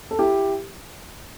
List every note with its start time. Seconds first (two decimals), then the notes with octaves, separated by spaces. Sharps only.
0.11 A4
0.19 E4 G4